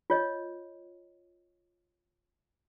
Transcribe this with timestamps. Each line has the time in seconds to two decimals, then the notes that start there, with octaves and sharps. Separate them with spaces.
0.10 F4 C#5 D#5